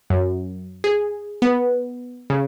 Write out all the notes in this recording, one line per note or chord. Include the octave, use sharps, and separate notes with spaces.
F#2
G#4
B3
C#3